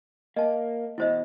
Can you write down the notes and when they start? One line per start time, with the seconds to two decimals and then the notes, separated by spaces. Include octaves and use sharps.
0.36 A#3 D#5 A5
0.98 E2 B2 E4 C5 D#5